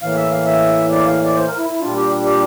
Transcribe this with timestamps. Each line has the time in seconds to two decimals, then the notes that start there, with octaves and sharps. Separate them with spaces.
0.01 A2 E3 A#3 F5
0.16 E5
0.31 F5
0.46 E5
0.91 D5
1.06 F5
1.25 D5
1.36 C5
1.48 A#4
1.58 E4
1.69 E4
1.80 A#2 G3 D4 F4
1.96 G4
2.25 G4